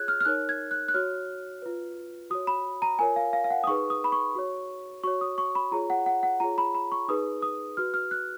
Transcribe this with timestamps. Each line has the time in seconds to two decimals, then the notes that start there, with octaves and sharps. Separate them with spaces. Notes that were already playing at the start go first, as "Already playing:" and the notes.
Already playing: F4 G#4 C#5 F#6 G#6
0.08 F6
0.21 F6
0.25 D#4 A#4 C#5 F#6
0.49 G#6
0.71 F#6
0.88 F#6
0.94 F#4 C#5 F6
1.62 F4 B4
2.30 F#4 C#5 D#6
2.47 B5
2.82 A#5
2.99 F4 A#4 C#5 G#5
3.16 F5
3.33 F5
3.44 F5
3.50 F#5
3.64 D#6
3.67 D#4 G#4 B4 C#6
3.90 D#6
4.04 B5
4.12 C#6
4.35 F#4 C#5
5.04 F#4 C#5 C#6
5.21 D#6
5.38 C#6
5.55 B5
5.72 F4 G#4 C#5 A#5
5.90 F#5
6.06 F#5
6.23 F#5
6.40 F4 G#4 C#5 A#5
6.58 B5
6.75 B5
6.92 C#6
7.08 D#4 G#4 B4 D#6
7.42 D#6
7.77 F#4 B4 F6
7.94 F6
8.11 F#6